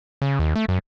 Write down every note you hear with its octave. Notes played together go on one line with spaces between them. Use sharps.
C#3
D#2
A3
F#2